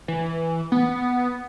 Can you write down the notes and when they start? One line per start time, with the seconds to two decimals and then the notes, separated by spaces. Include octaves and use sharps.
0.08 E3
0.72 B3